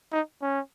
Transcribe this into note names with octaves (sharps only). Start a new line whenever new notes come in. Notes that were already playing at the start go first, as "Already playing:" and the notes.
D#4
C#4